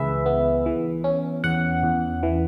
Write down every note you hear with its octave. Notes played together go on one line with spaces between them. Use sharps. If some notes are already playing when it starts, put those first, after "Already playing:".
Already playing: C#2 E3 G#4 B4 E5
B3
E3
C#4
E2 F#5
E2
E3